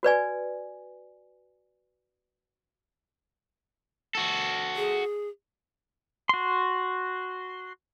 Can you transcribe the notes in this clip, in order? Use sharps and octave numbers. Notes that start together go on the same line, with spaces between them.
F#4 B4 D5 G#5
F#4 A4
G#4
F#4 C6